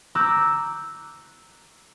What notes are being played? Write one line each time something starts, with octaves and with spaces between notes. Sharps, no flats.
A#5 D6 E6 F#6 G6